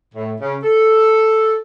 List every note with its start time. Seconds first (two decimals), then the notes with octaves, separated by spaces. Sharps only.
0.14 A2
0.39 C#3
0.63 A4